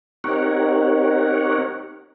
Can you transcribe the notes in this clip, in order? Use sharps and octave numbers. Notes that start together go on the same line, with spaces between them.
C4 D#4 G4 A#4 C#5 F#5